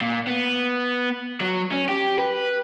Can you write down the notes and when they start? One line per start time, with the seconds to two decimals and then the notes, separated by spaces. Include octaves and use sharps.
0.01 A#2
0.27 B3
1.40 F#3
1.71 C#4
1.89 G4
2.18 B4